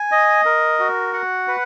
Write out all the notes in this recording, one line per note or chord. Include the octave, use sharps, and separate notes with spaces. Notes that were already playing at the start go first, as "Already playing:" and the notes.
Already playing: G#5
D#5
A#4
F#4
F#5
B4